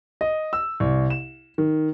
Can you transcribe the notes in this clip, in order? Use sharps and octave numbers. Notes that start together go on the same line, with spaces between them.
D#5
E6
C2
E7
D#3